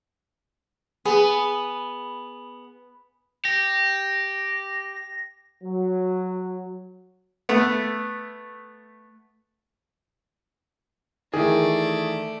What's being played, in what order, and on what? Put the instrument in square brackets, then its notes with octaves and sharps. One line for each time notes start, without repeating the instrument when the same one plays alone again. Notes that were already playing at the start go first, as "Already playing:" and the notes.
[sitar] B3 [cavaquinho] G#4
[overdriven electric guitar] G4 [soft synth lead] A#6
[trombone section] F#3
[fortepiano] A3 B3
[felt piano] D#3 E3 [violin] A3 D5 [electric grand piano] G#4